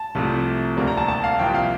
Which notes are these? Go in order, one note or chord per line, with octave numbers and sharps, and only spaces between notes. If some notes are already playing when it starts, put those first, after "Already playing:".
Already playing: A5
C2 C3 F3 A3
D2 C3 G3 A#3
A#5
A5
A5
F5
C2 C3 F3 A#3 G5
F5